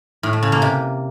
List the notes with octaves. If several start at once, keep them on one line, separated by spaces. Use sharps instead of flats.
A2
A3
C#3
A#3
C3